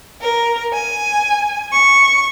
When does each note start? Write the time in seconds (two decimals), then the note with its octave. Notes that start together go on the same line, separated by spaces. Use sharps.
0.21 A#4
0.73 G#5
1.72 C#6